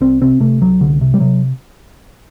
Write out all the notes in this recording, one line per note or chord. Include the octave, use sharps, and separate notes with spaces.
C2 C4
C3 C4
C3 A3
C2 F#3
C2 D3
C3
G3
C3 F#3